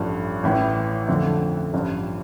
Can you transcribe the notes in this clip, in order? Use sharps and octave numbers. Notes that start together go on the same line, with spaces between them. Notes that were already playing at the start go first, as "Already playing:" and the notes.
Already playing: A1 G2 F3 A3
A1 A2 E3
F2 D3 F3 A3
A1 G2 F3